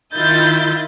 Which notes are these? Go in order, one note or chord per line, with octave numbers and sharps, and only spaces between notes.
D#3 E4 F4 D#5 G6 A6